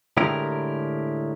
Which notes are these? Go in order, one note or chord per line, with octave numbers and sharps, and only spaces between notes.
A2 D3 G#3 E4 G4 A#4